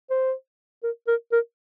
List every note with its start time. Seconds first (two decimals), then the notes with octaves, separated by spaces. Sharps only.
0.10 C5
0.83 A#4
1.08 A#4
1.32 A#4